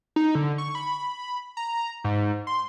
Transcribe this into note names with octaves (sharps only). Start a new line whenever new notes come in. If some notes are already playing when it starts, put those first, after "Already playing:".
D#4
D3
C#6
B5
A#5
G#2
C6